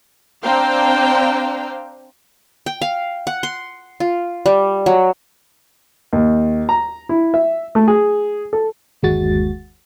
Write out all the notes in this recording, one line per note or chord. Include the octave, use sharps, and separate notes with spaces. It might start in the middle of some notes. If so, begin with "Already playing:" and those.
C4 D4 C5 F5 G5 A#5
G5
F5
F#5
C6
F4
G3
F#3
D#2
A#5
E4
E5
A3
G#4
A4
G1 D#2 G#3 F#4 A6